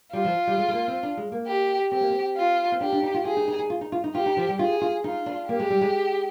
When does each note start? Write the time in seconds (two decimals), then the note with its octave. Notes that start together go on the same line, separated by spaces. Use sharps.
0.13 G3 F4
0.25 F3
0.47 G3
0.58 G#3
0.68 G#3
0.73 A#3
0.88 C4
1.03 D4
1.17 G#3
1.32 A#3
1.47 G4
1.91 C4 G4
2.01 A#3
2.10 C4
2.36 F4
2.72 C4
2.80 D4 G4
2.92 D4
3.03 D#4
3.14 F4
3.25 F4 G#4
3.37 D#4
3.48 D#4
3.59 D#4
3.70 F4
3.81 D#4
3.92 F4
4.04 D#4
4.15 F4 G4
4.26 D#4
4.37 F3
4.49 G3
4.59 F4 G#4
4.81 F4
5.04 D#4 F4
5.26 D4
5.49 A#3 G4
5.60 G#3
5.70 G3
5.81 G#3